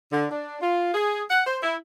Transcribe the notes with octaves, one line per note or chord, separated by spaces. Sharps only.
D3
D4
F4
G#4
F#5
C5
E4